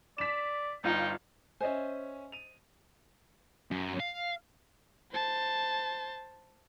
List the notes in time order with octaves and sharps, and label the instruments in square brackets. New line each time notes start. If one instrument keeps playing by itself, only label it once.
[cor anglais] D5 [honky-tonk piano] B6 E7
[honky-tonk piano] G1 F4 [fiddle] D#4 [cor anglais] G5
[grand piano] C#4 E5 G#5 [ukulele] C5 D#5
[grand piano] D#7 F7
[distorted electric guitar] F#2
F5
[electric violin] C5 A5